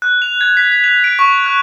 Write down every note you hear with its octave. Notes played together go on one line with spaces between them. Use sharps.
F#6
F7
G#6
B6
B6
F7
D7
C#6
F#6